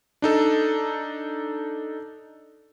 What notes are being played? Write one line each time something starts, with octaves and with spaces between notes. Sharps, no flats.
D4 D#4 A4